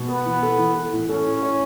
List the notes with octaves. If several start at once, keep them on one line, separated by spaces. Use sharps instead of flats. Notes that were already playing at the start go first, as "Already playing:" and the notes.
Already playing: B2
B3 B4
E3
A4
E3
A4
A2
C#4 A4
A2
C#5